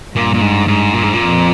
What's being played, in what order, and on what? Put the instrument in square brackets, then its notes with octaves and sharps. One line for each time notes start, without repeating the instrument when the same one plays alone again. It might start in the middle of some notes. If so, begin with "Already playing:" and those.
[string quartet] G2 [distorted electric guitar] A#2
[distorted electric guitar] A#2
G#2
G#2
A#2
G#2
A#2
[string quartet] F2